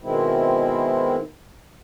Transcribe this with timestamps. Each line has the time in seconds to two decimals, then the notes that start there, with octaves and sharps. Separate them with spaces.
0.02 B2 D#3 G#3 C4 E4